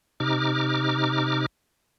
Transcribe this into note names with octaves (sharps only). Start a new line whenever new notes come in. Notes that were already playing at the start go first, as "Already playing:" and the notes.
C3 D#4 D6 F6